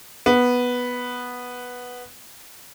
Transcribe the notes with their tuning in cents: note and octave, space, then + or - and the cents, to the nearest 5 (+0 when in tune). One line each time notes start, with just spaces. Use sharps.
B3 -5